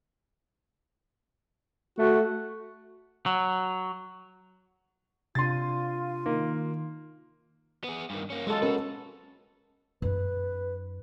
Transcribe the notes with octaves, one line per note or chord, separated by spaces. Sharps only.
A3 F#4
F#3
C3 D4 F4 C6 A6 D#7
D#3 A#3
B3 G#4
G2 D#3
A#3 C#4
F#3 G#3 F4 A4
C#4 F#4 A#4 B4
F#2 D#4 B4